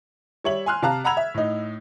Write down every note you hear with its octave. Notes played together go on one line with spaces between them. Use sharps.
G3 C#5 E5 F#7
G#5 C6 F6 F#6
C3 F5 A5 A#5 F#6
F#5 A#5 B5 E6 G#6 F7
E5
A2 D#4